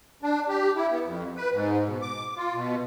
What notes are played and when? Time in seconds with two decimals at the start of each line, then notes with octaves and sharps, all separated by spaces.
0.22 D4
0.49 G4
0.76 E4
0.91 B3
1.04 F2
1.37 B4
1.52 G#2
1.86 B2
2.02 D6
2.37 F4
2.54 B2